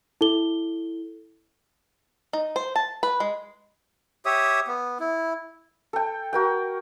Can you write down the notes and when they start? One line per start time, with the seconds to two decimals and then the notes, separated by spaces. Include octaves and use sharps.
0.21 E4 A4 G7
2.33 D#4
2.56 C5
2.76 A5
3.03 B4
3.20 G#3
4.25 G4 C#5 E5 D#6
4.67 B3
5.00 E4
5.93 A4 G5
6.33 F#4 A#4 G5